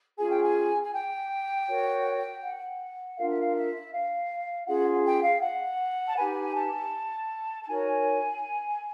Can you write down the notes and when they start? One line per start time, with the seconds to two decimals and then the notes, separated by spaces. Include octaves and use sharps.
0.18 C#4 F4 G#4 G#5
0.30 G5
0.42 G#5
0.82 G#5
0.92 G5
1.68 F#4 A#4 C#5
2.42 F#5
3.17 D4 F4 A#4 F5
3.28 E5
3.39 F5
3.54 E5
3.93 F5
4.66 C#4 F4 G#4 F#5
5.05 G5
5.23 F5
5.41 F#5
6.08 A5
6.16 D#4 G4 B4 G#5
6.54 A5
7.61 A5
7.66 D#4 F#4 A#4 C#5 G#5